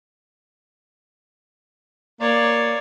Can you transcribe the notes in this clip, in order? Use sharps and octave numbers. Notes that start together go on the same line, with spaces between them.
A#3 C#5 D5